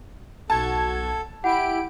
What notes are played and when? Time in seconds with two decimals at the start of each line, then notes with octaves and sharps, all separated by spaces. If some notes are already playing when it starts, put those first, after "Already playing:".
0.50 B1 F#4 A4 A5 G#6
1.44 E4 G4 F#5 B5 D7